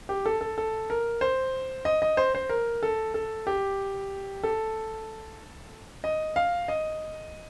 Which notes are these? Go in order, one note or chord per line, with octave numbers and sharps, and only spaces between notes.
G4
A4
A4
A4
A#4
C5
D#5
D#5
C5
C5
A#4
A4
A4
G4
A4
D#5
F5
D#5